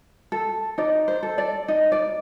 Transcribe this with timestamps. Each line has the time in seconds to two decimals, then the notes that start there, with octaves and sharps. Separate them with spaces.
0.32 A4
0.78 D#4 D5
1.08 C5
1.23 A4
1.38 D5
1.68 D#4
1.92 D5